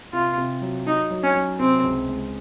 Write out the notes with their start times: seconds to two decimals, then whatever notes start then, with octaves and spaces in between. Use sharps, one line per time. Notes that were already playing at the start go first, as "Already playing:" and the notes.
0.13 C3 F4
0.38 C3
0.62 F#3
0.86 F#3 D#4
1.11 F#3
1.23 C#4
1.35 F#3
1.59 C3 C4
1.84 C#2
2.08 G#3